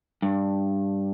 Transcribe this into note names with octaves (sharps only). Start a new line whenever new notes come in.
G2